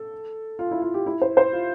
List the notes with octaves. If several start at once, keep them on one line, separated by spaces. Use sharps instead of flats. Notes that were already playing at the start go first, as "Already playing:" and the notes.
Already playing: A4
F4
E4
F4
G4
E4
C5
C5
F4